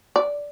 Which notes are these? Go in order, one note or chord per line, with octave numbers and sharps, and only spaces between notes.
D5